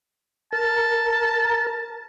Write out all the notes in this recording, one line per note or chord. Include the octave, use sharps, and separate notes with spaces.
A#4 A5